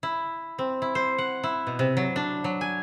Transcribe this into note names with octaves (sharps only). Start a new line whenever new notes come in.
E4
C4
E4
C5
F#5
E4
B2
C3
F#3
D4
F#3
G#5